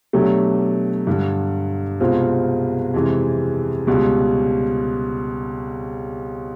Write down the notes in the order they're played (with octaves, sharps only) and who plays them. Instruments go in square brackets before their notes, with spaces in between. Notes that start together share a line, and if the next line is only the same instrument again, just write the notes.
[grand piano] B2 F#3 A3 D4 G4
G2 D3 G3
C2 B2 G#3 C4 F4
F2 C3 E3 G#3
C#2 B2 G3